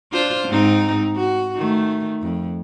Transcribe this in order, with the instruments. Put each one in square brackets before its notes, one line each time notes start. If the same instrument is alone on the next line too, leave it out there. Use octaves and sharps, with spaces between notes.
[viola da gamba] D4 F4 C5
G#2 C4 D#4
F#4
D#3 A3
F2